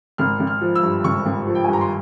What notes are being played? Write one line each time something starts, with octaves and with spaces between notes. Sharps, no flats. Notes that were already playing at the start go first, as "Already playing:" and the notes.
G#1 F6
G#1
F6
F3
E6
G2
G#1 C#6
G#1
F3
G5
G2 G#5
A#5
C6